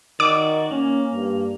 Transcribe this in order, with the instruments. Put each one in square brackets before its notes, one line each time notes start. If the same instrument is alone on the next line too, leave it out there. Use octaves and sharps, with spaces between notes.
[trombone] D#3 [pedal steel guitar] F#4 D5 [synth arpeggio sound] D6
[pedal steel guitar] A#3 [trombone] C#4
[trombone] G2